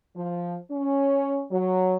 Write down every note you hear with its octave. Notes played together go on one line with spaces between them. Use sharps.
F3
C#4
F#3